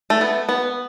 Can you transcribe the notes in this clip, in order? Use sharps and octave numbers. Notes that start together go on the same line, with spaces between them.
A3
B3
B3